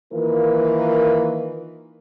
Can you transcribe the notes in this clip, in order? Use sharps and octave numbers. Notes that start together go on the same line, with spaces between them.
D#3 E3 A#3 F4 A#4 B4